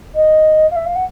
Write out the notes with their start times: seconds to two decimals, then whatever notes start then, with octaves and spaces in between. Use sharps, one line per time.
0.15 D#5
0.70 F5
0.75 E5
0.85 F5
0.95 F#5